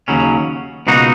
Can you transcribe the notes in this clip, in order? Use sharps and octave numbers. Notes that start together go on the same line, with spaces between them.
D#2 C#3 F#3 C#4
C#2 B2 A#3 D#4 F#4